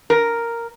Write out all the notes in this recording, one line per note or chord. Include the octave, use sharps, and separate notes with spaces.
A#4